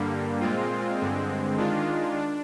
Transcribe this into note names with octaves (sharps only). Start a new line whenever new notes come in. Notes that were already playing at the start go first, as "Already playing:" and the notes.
Already playing: G2 D3 G3 A#3
A#2 G#3 C4 F4
G2 D3 G#3 C4
D#3 G#3 D4 F4
D4